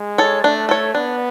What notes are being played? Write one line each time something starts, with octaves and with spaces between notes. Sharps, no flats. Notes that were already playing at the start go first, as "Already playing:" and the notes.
Already playing: G#3
A4 C#5
A3 D4
A4 C#5
B3 D4